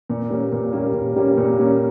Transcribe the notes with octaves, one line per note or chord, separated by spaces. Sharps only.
A#2
G3 A#3 C#4
A#2
G3 A#3 C#4
A#2
G3 A#3 C#4
A#2
G3 A#3 C#4